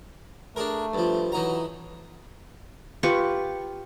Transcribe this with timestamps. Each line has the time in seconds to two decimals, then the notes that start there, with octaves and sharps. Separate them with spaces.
0.56 A3 D4 G#4 A#4
0.94 G2 F3
1.32 E3 F#3 D#4 A#5
3.03 F4 G4 B4 C#6